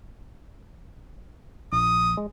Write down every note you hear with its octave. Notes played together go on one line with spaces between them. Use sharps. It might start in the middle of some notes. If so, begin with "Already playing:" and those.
A#1 D#6
G#3